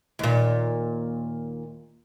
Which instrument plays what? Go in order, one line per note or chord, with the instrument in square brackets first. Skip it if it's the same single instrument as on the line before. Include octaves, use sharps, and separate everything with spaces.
[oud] D#2 A#2